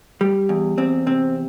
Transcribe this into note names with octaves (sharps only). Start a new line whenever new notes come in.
G3
E2
E2 C4
C3 C4